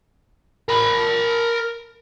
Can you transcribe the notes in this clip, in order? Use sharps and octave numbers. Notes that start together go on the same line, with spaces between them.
A#4 B5